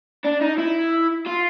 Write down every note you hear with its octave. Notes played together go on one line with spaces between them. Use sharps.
D4
D#4
E4
F4